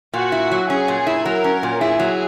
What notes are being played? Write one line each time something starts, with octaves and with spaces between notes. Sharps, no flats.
A#2 F#4
E4
F#3
C#4 G#4
A#2
E4
F#3 A#4
C#4
A#2
E4 G#4
F#3